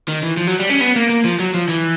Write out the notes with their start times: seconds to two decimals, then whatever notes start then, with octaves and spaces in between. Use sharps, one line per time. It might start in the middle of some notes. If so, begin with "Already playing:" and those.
0.08 D#3
0.23 E3
0.37 F3
0.47 F#3
0.59 G3
0.70 C#4
0.81 B3
0.96 A#3
1.09 A#3
1.24 F3
1.39 F#3
1.54 F3
1.68 E3